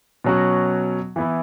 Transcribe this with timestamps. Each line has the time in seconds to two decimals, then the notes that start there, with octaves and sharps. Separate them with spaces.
0.24 B2 F#3 C#4 F#4
1.16 E3 B3 E4